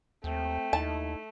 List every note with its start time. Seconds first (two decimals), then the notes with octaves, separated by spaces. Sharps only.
0.24 D#2 A3 C4 G5
0.73 D#2 D#4 E4 A5